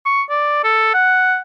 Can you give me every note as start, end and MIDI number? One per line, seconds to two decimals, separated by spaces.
0.06 0.22 85
0.30 0.60 74
0.64 0.94 69
0.94 1.39 78